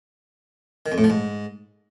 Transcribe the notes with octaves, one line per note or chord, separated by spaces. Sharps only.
D#3
F2
A2
F3
G#2